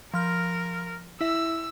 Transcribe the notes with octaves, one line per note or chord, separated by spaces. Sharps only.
F3 A#4 F6
E4 E5 E6